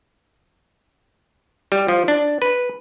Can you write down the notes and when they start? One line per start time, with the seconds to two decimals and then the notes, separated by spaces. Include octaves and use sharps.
1.72 G3
1.88 F3
2.08 D4
2.42 B4